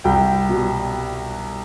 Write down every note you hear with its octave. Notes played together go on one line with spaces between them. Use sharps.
C2 G5
B2 G3